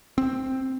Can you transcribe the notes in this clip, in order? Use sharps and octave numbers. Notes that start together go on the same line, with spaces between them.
C4